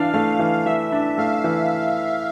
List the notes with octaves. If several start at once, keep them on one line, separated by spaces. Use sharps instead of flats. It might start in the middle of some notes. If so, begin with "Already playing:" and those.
Already playing: E3 D4 F5
A3 F5
E3
E3 E5
D4
A3 F5
E3